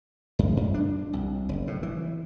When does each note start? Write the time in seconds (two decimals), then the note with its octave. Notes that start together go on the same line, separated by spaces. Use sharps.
0.39 F#2
0.57 F#2
0.74 D4
1.13 C2
1.49 F#1
1.67 A2
1.83 E3